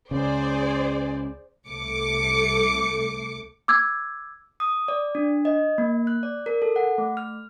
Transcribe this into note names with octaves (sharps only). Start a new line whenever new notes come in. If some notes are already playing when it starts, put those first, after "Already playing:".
C#2 C#3 G#4 C5 D5
C2 A3 D6 C#7
D6 E6 G#6
D#6
D5
D4
D#5
A#3
F#6
D5
A#4
A4
F#5
A3
F6